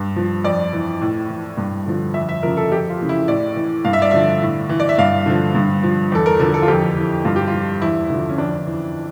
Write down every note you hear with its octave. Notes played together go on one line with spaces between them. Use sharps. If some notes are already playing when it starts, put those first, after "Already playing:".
Already playing: G2
F3
F2 D5
E3
A2
E3
G2
D3 F3
F2 E5
E5
C#3 F3 A#4
A4
F2 G4
F4
C#3 E3
E4
A2 D5
E3
G2 F5
E5
D5
D3 F3 E5
A2
E3
D5
E5
G2 F5
D3 F3
G2
F3
E2 A4
A#4
D3 F3 A#4
A4
F4
F2 G4
E3
G2 F4
G4
F4
F3
E2 E4
D3 F3 E4
C#4
F2 D4
E3